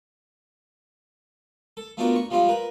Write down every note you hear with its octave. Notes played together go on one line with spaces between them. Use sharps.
A4
A3 B3 D4 F4 F#4 A#4
C#6
F3 G3 G#3 C4 F4
A#4 B4